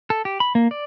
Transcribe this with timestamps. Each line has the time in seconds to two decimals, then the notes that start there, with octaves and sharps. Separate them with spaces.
0.10 A4
0.25 G4
0.40 B5
0.55 A#3
0.71 D5